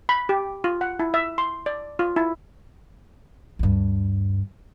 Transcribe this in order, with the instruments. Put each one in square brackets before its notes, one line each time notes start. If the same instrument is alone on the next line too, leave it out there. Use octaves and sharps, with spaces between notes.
[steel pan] B5
G4
F4
F#5
E4
E5
C6
D5
F4
E4
[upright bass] D2 G2